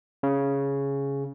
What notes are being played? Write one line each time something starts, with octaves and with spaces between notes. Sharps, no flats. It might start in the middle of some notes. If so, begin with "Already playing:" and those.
C#3